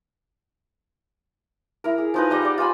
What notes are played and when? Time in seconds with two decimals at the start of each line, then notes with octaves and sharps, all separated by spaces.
1.84 E4 A#4
1.98 G#4
2.14 F3 D#4 B4
2.30 G3 D#5 A#5
2.42 D5 F#5
2.58 F4 C5 G#5 B5